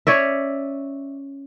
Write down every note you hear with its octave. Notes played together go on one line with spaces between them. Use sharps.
C#4 C#5 D5 E5